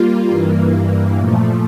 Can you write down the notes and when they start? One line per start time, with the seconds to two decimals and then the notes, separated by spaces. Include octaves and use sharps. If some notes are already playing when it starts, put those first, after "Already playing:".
Already playing: G3 A#3 F4
0.28 G2 E3 A#3
1.17 A#2 F3 A3